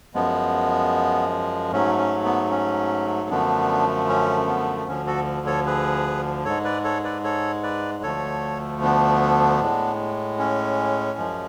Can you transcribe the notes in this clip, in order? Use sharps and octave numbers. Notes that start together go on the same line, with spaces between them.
F#2 F3 G#3 B3
G#2 F#3 A3 C#4
C#4
B3
C#4
F#2 D3 F3 A3 B3 D4
C#4
B3
D2 D3 F3 C#4
F#4 A4
A4 C#5
G#4 B4
G#2 G#3 A4 C#5
B4 D5
A4 C#5
B4 D5
A4 C#5
B4 D5
D2 D3 F3 A3 A4 C#5
B3 D4
A2 G#3
C#4
F#2 F3 G#3